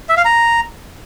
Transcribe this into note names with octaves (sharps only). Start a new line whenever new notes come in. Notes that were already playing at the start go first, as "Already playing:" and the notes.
E5
F5
A#5